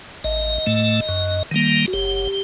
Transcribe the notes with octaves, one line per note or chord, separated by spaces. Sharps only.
A1 D#5
A2 A3
F#2
D#3 G3 A#3
F#4
F#1 G4